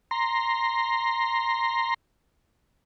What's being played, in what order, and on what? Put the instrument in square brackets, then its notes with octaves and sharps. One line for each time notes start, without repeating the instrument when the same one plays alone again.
[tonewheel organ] A#5 C6